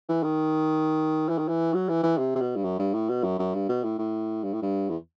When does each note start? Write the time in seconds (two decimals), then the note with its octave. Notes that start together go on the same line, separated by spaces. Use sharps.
0.09 E3
0.23 D#3
1.29 E3
1.38 D#3
1.48 E3
1.74 F#3
1.89 E3
2.03 E3
2.18 C3
2.35 C3
2.41 B2
2.56 G2
2.64 F#2
2.79 G2
2.94 A2
3.09 B2
3.24 F#2
3.39 F#2
3.54 G2
3.69 B2
3.84 A2
3.99 A2
4.44 G2
4.54 A2
4.62 G2
4.89 E2